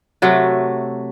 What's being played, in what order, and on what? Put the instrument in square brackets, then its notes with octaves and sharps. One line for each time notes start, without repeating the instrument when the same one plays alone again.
[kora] C3 F#3 A3